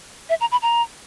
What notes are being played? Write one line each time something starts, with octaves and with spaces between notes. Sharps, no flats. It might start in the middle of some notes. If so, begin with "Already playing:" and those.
E5
A#5
B5
A#5